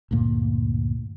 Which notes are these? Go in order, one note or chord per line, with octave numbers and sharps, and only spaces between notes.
D2 G2 A#2 A#3